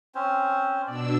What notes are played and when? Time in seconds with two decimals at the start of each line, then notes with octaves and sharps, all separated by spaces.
0.15 C4 C#4 C5
0.87 B2 D4 D5 E6